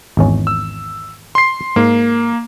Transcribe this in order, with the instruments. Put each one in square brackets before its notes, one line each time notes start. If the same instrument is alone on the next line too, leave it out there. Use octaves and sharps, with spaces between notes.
[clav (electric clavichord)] G#1 E2 C#4
[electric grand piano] E6
C6 C7
[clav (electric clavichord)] G#2 [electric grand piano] A#3